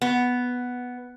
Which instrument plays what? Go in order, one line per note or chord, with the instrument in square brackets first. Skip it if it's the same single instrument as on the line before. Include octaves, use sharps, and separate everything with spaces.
[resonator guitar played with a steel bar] B3